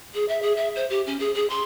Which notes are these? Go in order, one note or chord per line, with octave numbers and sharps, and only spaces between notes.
G#4
E5
G#4
E5
C5
G4
C#4
G#4
G#4
C6